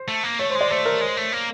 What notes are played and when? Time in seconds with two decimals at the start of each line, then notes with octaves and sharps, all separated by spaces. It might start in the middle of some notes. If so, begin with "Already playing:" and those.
Already playing: C5
0.08 A3
0.23 A#3
0.39 A3 C#5
0.50 C5
0.55 G#3
0.61 D5
0.70 A3 C5
0.86 A#4
1.01 G#3 C5
1.17 A3
1.32 A#3